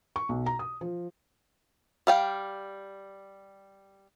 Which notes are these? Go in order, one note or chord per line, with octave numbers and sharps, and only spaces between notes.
C#6
B1
A#5
D#6
F3
G3 F5 G5